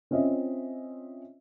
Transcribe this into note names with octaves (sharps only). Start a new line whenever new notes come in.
C4 C#4 F4 D#5 E5